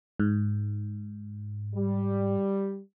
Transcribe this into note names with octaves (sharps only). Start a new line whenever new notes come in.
G#2
G3